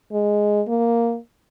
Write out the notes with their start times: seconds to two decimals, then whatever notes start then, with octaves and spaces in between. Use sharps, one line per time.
0.12 G#3
0.68 A#3